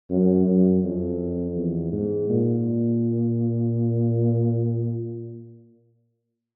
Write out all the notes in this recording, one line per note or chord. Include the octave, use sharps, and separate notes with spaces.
F#2
F#2
F2
E2
G#2
A#2